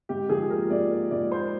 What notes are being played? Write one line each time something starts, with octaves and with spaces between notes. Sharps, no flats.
G#2 G4
F3 G#4
A#3 A#4
G#2 D5
A#3
G#2 D5
A#3 C5